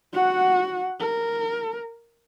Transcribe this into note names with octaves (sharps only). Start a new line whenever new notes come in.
F#4 F#5
A#4